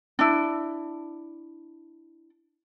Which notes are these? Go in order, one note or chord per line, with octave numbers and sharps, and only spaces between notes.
D4 E4